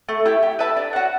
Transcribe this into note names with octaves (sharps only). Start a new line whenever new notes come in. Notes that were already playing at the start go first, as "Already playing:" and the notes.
A3
E4 G4
G4
B4 E5 A5
D4
F#4 C#5 F#5